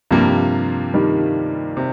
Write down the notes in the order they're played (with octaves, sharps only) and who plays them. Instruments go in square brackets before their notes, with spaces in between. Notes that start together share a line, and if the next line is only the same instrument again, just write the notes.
[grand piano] G2 G3 A#3 [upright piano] C3 F3
[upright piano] D#3 G3
[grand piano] C3